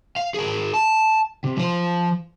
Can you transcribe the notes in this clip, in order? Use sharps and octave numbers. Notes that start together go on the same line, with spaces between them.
F5
G#4 A#4
A5
C3
F3 C5